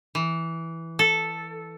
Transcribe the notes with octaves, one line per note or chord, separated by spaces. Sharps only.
E3
A4